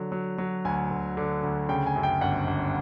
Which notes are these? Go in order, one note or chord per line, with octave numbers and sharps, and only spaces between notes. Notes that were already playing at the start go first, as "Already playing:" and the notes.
Already playing: D3 F#3
F#3
F#3
D2 G#5
D2
D3
D2
C#3 G5
G#5
F#2
G5
G1 F#5
G1